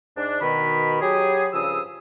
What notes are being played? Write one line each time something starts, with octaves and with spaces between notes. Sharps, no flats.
G#2 D4
B2 D#3 B5
F#3 G4 G#4
G2 C#3 F3 D#6 E6